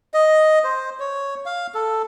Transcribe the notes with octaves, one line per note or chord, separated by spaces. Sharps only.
D#5
C5
C#5
F5
A4